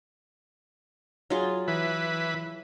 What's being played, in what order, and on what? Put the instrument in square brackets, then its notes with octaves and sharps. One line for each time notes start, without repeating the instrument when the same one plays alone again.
[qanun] F#3 F4 G#4
[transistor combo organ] E3 B4